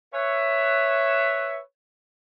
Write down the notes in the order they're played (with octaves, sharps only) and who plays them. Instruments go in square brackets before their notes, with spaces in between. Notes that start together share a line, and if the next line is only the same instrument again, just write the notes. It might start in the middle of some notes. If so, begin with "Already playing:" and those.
[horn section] B4 C#5 E5